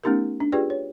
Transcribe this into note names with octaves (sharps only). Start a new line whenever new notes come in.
A3 B3 C#4 D#4 G4 A#4
D4
F4 G4 G#4 B4 D5 G5
C#5